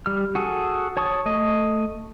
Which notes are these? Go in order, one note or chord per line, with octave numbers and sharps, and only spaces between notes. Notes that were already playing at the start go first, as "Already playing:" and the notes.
G3 F6
F#4 G#4 A4
C#5 A5 C#6 D#6
A3 D#5